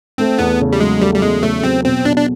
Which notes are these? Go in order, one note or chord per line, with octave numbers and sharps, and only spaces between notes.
A3 C4
E2 B3
C#3
G3
F#3 G#3
G3 A3
G3
E2 G#3
C#3 A3
F#3 C4
B2 C4
B2 D4
D4